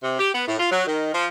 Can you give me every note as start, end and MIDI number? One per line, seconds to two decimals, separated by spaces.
0.03 0.19 48
0.19 0.29 67
0.34 0.43 59
0.48 0.56 45
0.59 0.69 65
0.71 0.87 54
0.87 1.11 51
1.13 1.28 53